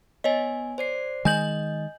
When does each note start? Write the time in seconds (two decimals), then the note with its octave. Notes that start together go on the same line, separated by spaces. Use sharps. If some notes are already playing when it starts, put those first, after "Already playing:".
0.24 B3 C#5 D#5 G#5
0.78 C5 D5 C7
1.25 D#3 G#3 D#5 G#5 G6 F#7